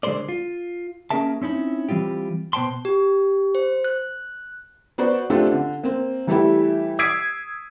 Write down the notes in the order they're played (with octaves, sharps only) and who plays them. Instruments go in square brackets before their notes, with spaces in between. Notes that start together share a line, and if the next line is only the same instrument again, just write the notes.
[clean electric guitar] D3 G#3 G#4 A#4 C5 D5
F4
A#3 C#4 G#4 A#4 E5 A5
C4 C#4 D#4 E4
E3 G3 C4 F4 G4
B2 B3 C5 G5 A5 C6
[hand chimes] G4
C5
F#6
[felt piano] B3 F#4 C5 D5
A3 C4 D4 F4 G4 A4
D3
A#3 C4
E3 G3 A3 E4 G4 E5
D#6 E6 G#6 B6 C7 D7